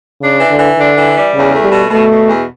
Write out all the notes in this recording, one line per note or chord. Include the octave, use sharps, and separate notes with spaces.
C#3 D4
E3
D3
E3
D3 D4
E3
G3
E2 C#3
A3
G3
B2
B2 A3
B2
E2